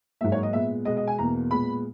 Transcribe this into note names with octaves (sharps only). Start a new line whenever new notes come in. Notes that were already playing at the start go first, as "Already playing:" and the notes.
G#2 F#3 A#3 E5
C#5
D#5
A#2 G#3 B3 E5
B2 G#3 B3 D#5
D#5
G#5
E2 B2 A#3 A#5
A#2 G#3 B3 B5